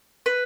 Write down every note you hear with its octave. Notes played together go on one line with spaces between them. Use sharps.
B4